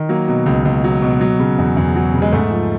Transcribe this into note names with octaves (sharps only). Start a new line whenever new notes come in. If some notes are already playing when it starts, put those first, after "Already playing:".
Already playing: D#3
F#3 A#3
B2
C#2
C#2
F#3
B2
F#3
C#3
E2
E2
F#3
C#3
G#3
G#2 A3
F3